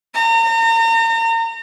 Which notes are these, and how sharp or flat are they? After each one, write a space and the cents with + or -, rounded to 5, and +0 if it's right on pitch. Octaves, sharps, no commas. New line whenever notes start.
A#5 -40